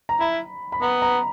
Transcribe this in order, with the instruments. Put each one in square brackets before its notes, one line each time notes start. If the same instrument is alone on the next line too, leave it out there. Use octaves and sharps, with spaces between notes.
[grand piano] A#5
[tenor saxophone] E4 [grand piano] B5
[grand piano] B5
[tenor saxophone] B3 [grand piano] A#5
[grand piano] A#5